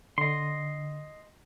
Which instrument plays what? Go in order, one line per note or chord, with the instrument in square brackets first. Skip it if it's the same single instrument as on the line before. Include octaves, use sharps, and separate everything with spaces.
[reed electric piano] D3 [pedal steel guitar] D#5 C6